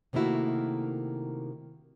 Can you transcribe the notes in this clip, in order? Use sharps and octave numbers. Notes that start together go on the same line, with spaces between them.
C3 D#3 A3 A#3 E4 F#4